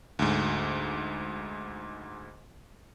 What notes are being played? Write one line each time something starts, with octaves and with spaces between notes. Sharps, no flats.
D2 G#2